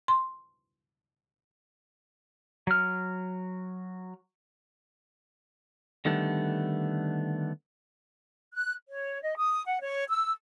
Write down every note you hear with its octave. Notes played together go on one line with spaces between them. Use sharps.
C6
F#3 F6
D3 D#3 G3 A3 B3 D4
F#6
C#5
D#5
D#6
F#5
C#5
E6